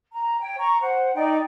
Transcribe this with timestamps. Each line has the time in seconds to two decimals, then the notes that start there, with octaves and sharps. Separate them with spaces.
0.12 A#5
0.40 C#5 G5
0.58 A#5 C#6
0.81 C5 F#5
1.15 D#4 D5 G5